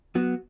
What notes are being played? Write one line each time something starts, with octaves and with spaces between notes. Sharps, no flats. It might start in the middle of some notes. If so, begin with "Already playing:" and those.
F#3 B3 F#4